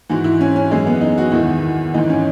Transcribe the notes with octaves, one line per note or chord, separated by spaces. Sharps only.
G#2 E3 F#4
E4
C#4
C#4
F#2 E3 G#3
B3
D#4
F#4
E2 D#3 E4
G#2 E3 D#4
C#4